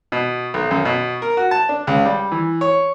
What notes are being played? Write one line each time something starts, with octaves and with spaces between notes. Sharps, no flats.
B2
B1
F#2
B2
A#4
F#4
A5
D4
C#2
G3
E3
C#5